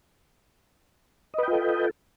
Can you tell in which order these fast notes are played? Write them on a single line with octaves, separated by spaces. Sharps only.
D#5 B4 G5 F4 A4